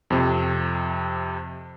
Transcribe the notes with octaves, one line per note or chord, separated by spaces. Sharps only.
F2 C3